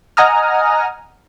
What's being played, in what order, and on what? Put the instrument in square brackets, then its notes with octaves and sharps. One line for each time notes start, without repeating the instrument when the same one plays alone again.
[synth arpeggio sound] D#5 F#5 G#5 A#5 D#6 F6